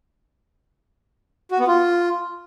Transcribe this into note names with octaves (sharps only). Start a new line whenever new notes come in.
F#4
B3
F4